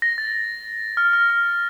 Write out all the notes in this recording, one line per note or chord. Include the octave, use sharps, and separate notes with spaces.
A#6
A6
F6
F6
F6